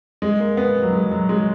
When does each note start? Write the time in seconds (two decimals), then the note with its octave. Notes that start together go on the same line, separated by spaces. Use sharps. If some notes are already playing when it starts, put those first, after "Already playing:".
0.22 G#3
0.40 A#3
0.57 B3
0.82 F#3
0.93 G#3
1.11 F#3
1.29 G#3